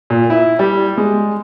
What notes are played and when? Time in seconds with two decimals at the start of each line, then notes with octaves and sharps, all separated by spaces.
0.10 A#2
0.30 E4
0.59 G3
0.97 G#3